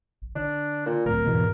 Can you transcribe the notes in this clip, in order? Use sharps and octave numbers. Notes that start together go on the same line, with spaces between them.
A#1
D3 D4
A#2
D1 C2 A#4
E2 G#2 B2